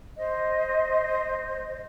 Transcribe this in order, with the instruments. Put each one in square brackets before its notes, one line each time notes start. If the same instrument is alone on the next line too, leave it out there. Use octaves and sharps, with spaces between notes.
[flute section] C5 D#5